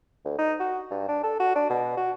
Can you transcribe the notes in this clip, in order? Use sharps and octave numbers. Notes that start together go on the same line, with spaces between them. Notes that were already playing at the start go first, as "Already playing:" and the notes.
D2
D#4
F#4
G2
D4
A4
F#4
D4
B2
F#4